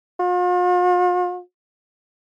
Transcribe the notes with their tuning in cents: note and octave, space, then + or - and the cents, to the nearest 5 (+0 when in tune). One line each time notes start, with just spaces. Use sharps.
F4 +45